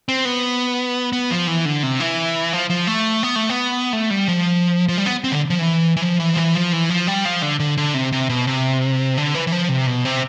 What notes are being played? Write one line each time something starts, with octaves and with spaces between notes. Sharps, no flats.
C4
B3
B3
F3
E3
D3
C3
E3
F3
F3
A3
B3
A3
B3
A3
G3
F3
F3
G3
B3
C4
D3
F3
E3
E3
F3
E3
F3
E3
F3
E3
F3
G3
F3
D3
D3
D3
C3
C3
B2
C3
D3
E3
E3
F3
C3
B2
C3